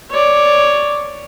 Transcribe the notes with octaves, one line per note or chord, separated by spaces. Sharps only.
C#5 D5